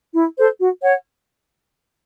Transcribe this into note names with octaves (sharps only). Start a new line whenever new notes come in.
E4
A4 C5
F#4
C#5 F#5